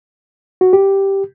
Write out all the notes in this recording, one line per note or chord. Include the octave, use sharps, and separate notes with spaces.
F#4
G4